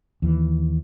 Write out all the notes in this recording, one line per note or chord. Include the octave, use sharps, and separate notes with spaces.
D#2 E3